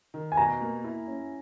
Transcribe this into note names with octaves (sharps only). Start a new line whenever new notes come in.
D#3
G#5
B2 A#5
A#3
E4
C#4